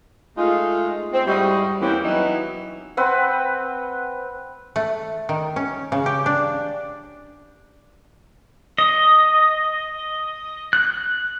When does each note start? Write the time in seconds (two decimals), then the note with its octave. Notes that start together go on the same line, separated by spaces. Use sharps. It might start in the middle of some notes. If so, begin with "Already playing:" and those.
0.37 G#3 A3 D#4 F4
1.13 C4
1.27 G#2 G3 E4 F#4 D#5
1.81 E2 E3 G3 A#3 C4 C#4
2.04 E3 F#3 B3 D#4 E4 F#4
2.97 C4 B4 F#5
4.76 A3
5.29 D#3
5.56 C#4
5.92 C#3
6.06 G4
6.26 D4
8.78 D#5
10.73 F#6